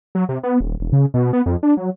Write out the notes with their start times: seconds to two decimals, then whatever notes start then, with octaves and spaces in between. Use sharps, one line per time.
0.15 F#3
0.29 C3
0.43 B3
0.61 D#1
0.80 E1
0.93 C#3
1.14 B2
1.33 B3
1.46 F2
1.63 D4
1.77 F#3